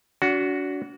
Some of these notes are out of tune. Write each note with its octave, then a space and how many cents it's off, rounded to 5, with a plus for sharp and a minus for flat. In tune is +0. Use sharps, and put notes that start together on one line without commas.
D4 -40 F#4 +0